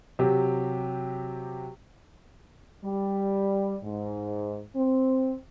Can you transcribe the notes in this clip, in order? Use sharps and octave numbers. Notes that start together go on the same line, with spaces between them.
C3 F#3 G4
G3
G#2
C4